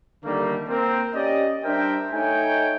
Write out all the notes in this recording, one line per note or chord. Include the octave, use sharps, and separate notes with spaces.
D3 D#3 G3 A3 A#3
A#3 C4 A#4
C#4 G4 D5 D#5
G3 D4 A#4 C5 E5 G5
A3 D#4 C#5 G5 G#5